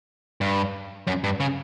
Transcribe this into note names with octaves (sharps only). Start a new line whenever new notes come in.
G2
F#2
G2
C#3